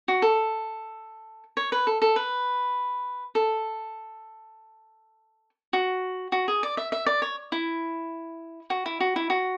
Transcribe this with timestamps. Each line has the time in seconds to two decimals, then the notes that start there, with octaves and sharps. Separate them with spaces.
0.08 F#4
0.22 A4
1.57 C#5
1.72 B4
1.87 A4
2.02 A4
2.16 B4
3.35 A4
5.73 F#4
6.32 F#4
6.48 G#4
6.63 D5
6.77 E5
6.92 E5
7.06 D5
7.22 C#5
7.52 E4
8.70 F#4
8.86 E4
9.00 F#4
9.16 E4
9.30 F#4